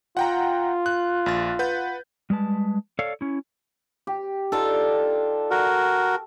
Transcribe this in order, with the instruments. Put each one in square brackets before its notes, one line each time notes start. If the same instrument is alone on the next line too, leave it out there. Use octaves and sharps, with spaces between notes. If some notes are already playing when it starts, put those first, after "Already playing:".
[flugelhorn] F4 [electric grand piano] F#5 G5 A#5
[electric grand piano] F#6
A#1 A6
B4 F#5 G6
[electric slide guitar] G3 G#3 B4 A5
A4 C#5 D5 F5
C#4 E4
[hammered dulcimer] G4
[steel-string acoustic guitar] D4 D#4 F4 [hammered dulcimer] A4
[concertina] F#4 A#4